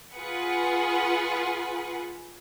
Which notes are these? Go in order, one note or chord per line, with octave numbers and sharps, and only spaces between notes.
F4 G#4 B4 F#5